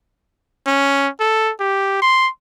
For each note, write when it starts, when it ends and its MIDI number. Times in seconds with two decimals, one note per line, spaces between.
0.67 1.08 61
1.20 1.51 69
1.60 2.01 67
2.02 2.29 84